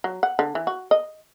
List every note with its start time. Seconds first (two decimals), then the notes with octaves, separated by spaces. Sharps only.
0.04 F#3
0.23 F#5
0.39 D3
0.55 E3
0.67 F#4
0.91 D#5